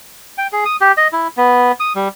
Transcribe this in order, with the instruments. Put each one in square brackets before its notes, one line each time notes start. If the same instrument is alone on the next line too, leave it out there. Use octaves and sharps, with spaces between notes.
[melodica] G5
G#4
D#6
G4
D#5
E4
B3
D#6
G3